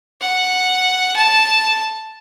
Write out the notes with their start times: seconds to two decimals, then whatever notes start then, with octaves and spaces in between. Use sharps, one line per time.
0.21 F#5
1.16 A5